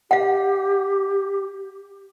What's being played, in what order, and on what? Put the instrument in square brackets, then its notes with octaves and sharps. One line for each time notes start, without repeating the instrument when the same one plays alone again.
[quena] G4 [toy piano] F5 F#5